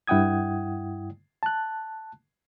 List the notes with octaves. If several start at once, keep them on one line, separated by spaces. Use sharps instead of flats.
G2 E4 F#5 G5 D#6 G#6
A5 F#6